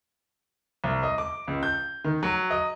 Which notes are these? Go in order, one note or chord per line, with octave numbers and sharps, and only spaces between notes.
C2
D#5
D6
C#2
G6
D#3
F#3
D#5